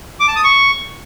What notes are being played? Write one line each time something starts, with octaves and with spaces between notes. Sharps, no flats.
D6
A5
D#6
C#6